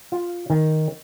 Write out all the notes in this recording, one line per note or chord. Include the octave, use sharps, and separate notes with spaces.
F4
D#3